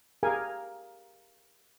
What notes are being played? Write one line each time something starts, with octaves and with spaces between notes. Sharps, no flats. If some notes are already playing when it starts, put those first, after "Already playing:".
G4 G#4 A#4 F5 G#5